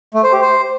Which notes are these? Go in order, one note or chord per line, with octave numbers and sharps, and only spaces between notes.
A3
C5
G4
C5